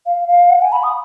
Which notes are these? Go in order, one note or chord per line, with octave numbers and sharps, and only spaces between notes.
F5
F5
F#5
G#5
B5
D#6